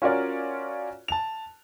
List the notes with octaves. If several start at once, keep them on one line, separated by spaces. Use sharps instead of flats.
C#4 F4 F#4 A#4 C#5 D5
A5 F7